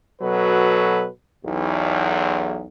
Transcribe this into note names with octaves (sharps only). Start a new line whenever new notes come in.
B2 F#3 A4 B4
B1 E2